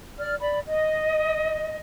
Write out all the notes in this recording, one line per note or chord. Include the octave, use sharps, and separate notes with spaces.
D5 F6
D5 B5
D#5